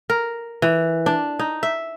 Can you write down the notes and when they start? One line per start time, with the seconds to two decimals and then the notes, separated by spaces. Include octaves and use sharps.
0.10 A#4
0.62 E3
1.06 D4
1.39 D#4
1.63 E5